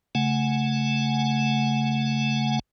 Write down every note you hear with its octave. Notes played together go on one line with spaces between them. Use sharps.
C#3 A3 F#5 G#5